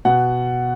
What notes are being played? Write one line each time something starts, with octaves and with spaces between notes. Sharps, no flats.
B2 F#5